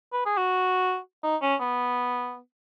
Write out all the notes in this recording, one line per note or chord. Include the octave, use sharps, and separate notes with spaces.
B4
G#4
F#4
D#4
C#4
B3